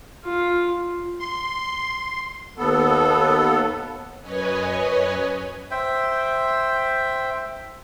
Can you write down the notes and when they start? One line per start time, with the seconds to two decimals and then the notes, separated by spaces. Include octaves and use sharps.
0.24 F4
1.20 C6
2.58 D#2 B3 A4
4.22 F#2 B4 C#5 D#5 G#5
5.71 C5 E5 G5